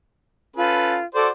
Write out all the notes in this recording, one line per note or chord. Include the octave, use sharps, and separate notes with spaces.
C#4 F4 A4 B4
F#4 A4 C5 D5 D6